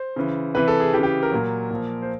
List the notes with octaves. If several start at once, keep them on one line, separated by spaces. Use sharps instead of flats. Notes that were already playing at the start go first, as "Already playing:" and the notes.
Already playing: C5
C#3 E3
C3 E3 B4
A4
G#4
C#3 E3 G4
G4
A#4
A#2 F#3
A#2 F3
C5